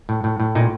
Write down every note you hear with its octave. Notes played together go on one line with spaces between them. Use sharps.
A2
A2
A2
A#2 D#4